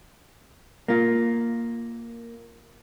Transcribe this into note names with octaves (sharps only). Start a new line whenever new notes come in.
A#3 F4